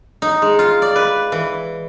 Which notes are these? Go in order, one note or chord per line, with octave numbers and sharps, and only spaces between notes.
D#4
G#3
F4
D5
B4
E3